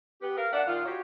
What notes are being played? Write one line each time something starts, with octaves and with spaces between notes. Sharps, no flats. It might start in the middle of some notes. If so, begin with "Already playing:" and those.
B3 G4
A#4 F5
A#3 D4 E5 F#5
A#2 D#3 F4
F#4 G4 C#5